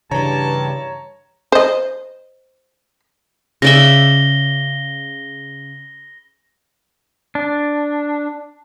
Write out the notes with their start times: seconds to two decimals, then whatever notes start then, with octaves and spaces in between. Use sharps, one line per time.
0.11 G2 C#3 E3 C#5 A5 A#5
1.52 C5 D#5
3.62 C#3 D5 E5 A#6 G7
7.35 D4